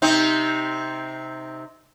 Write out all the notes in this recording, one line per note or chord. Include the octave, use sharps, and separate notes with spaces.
C3 C4 D#4